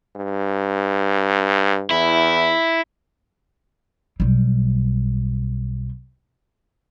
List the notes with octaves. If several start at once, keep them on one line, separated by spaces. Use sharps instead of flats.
G2
E2 E4
B1 G3